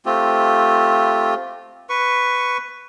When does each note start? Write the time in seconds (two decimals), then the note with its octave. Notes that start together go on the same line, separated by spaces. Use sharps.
0.06 A3 C4 F4 G4
1.89 B4 C#6